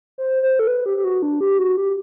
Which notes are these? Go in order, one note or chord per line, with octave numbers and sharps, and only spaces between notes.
C5
C5
A4
B4
G4
G4
F#4
D4
G4
F#4
G4